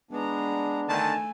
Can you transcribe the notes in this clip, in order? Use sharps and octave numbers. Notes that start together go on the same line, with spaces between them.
G#3 B3 D4 A#5
D3 D#3 A3 G#5 A5